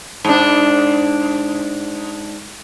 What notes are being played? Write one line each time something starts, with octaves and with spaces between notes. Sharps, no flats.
G#2 D4